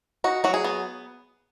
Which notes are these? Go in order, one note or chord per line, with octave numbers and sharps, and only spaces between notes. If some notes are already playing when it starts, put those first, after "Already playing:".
D#4 F#4
F#3 F#4
G#4
B3